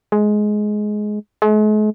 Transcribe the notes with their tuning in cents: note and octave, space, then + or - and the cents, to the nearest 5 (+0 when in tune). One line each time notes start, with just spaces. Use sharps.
G#3 +15
G#3 +45